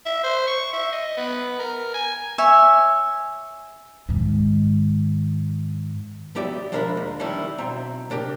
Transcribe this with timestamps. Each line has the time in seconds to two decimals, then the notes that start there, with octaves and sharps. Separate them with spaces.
0.06 E5
0.23 C5
0.47 C#6
0.73 E5
0.92 D#5
1.17 B3
1.59 A#4
1.94 G#5
2.38 C#5 E5 G#5
4.09 G#2 D#3
6.35 F#3 B3 G4 D5 E5
6.72 F3 G#3 D4 A#4 E5 B5
6.97 D#2
7.20 D#3 E3 G3 D4 E4
7.58 B1 C4 E5 A#5
8.10 C3 D4 G4 A#4